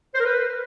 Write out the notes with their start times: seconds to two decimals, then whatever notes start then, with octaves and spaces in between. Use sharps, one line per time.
0.15 C5
0.20 A#4
0.25 B4